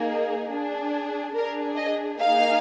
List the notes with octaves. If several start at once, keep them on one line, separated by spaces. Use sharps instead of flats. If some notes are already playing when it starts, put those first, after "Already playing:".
Already playing: A#3 D#4 G#4
D4 G#4
D4 G#4 A#4
D#5
A#3 D#4 G#4 F5